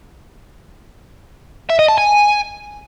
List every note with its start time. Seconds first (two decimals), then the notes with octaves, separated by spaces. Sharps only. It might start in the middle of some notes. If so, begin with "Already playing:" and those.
1.70 E5
1.79 D#5
1.89 A5
1.98 G#5